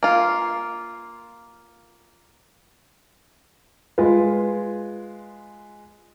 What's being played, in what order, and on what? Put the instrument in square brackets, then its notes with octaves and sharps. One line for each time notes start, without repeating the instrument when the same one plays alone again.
[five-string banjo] A#3 F4
[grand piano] G#3 F4 B4